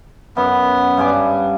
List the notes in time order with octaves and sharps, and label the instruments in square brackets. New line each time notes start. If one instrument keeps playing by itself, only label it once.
[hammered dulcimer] F#2 [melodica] B3
[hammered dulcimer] G2 G#5 D6